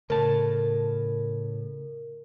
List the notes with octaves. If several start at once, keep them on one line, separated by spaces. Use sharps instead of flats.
A2 C#3 A#4 A5